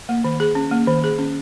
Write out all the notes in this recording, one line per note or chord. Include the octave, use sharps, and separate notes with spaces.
A#3
D#3
G#4
C#4
A#3
D#3
G#4
C#4